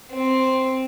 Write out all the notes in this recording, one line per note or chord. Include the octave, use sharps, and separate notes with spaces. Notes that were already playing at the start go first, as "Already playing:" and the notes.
C4